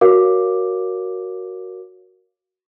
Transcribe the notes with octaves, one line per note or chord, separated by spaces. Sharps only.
F#4 A#4 C#5 F5 D6